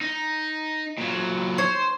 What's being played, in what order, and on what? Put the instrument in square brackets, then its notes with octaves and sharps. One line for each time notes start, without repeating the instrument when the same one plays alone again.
[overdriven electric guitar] D#4
A#2 F#3
[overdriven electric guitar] C5 [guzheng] C#5